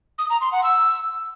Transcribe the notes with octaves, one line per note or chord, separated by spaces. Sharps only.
D#6
A#5
C6
F#5
E6